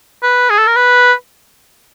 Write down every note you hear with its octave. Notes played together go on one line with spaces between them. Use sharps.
B4
G#4
A4
A#4
B4